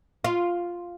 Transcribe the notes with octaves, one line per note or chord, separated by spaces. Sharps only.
F4